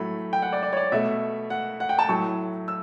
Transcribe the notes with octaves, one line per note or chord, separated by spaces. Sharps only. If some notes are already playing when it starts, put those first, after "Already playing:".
Already playing: A2 F#3 A3 B5
G5
F#5
D5
D5
C#5
D5
B2 A3 E5
F#5
F#5
G5
A5
A2 F#3 A3 C#6
E6